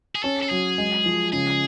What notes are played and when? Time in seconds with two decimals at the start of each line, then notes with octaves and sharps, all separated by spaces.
0.15 G#4
0.23 C#4 A4
0.43 A4
0.50 F#3 G#4
0.78 G#3
1.06 F3
1.33 C#3 G#4